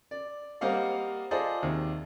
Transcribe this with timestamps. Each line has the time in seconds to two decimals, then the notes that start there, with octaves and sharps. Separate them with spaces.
0.11 D5
0.61 G3 A#3 C4 D#5 F5 F#5
1.31 F4 G#4 A4 C5 D5 D#5
1.62 D#2 C3